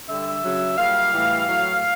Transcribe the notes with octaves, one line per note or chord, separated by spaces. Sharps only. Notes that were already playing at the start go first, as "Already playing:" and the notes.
D3 G3 E5
C#3 F#3
A#2 G3 F5
A2 E3 G3
A2 F#3